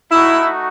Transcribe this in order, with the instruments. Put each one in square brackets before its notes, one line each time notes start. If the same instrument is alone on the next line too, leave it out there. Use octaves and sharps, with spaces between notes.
[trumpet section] A3 D#4 F#4 [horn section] E4